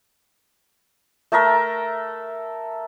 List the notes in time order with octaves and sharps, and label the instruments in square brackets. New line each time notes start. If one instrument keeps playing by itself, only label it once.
[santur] A3 A4 A#4 E5